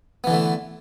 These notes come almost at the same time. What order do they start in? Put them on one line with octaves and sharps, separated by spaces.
B3 E3 D3 A3